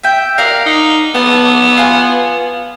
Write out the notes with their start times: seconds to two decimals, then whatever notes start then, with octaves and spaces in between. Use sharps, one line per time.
0.03 E5 G5
0.38 A#4 D5 F5 F#5
0.66 D#4
1.15 B3 F#5 A5
1.77 F4 F#5 G#5